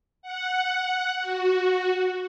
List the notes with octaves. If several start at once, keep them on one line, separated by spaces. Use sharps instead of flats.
F#5
F#4